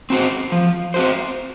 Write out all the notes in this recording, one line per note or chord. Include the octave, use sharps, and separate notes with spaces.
C4 F#4 C5
F3
C4 F#4 C5